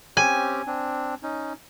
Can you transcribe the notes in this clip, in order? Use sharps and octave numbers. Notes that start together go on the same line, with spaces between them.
C4 C#4 G4 G#5
C4 D4
C#4 D#4